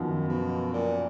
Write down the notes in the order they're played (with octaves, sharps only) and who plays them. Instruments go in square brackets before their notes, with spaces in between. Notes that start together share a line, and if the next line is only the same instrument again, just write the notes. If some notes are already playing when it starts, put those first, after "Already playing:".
Already playing: [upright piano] F#2 F3 B3 [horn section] D#3
[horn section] B2
A#2